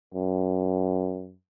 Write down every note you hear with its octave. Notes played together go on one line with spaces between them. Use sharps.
F#2